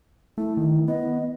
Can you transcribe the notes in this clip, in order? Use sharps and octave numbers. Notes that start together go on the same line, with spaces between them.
A3 E4
D#3
B3 D#5